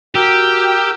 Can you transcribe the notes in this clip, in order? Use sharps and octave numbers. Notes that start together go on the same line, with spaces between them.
F#4 G4 A#4 G5 E6